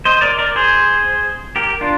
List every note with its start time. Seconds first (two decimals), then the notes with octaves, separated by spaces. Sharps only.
0.05 C5 D#5
0.21 A#4 D5
0.38 A#4 D5
0.56 G#4 C5
1.56 G4 A#4
1.81 D4 F4